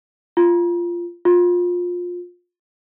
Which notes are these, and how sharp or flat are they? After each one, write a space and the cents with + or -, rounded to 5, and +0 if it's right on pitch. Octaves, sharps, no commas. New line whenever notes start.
F4 -10
F4 +20